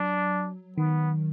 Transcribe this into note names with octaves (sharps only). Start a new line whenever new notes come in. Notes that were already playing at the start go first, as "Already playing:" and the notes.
Already playing: F#3 D4
D#3 B3